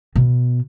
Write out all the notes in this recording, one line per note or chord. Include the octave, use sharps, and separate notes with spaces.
B2